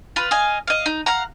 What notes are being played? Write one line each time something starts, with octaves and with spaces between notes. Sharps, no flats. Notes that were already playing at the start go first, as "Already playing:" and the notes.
F4 B4
D#5 F5 G#5
D#5 F5
D#4
F5 F#5 A#5